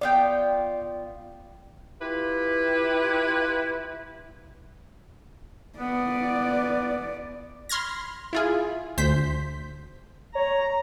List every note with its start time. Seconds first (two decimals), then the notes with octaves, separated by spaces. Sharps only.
0.01 B3 F4 D5 G5
2.02 E4 F4 G4 B4
5.79 B3 D5
7.69 B5 C6 F6 G#6 A#6
8.33 E4 F4 G#4
8.98 D2 C5 G6 B6
10.35 C#5 A#5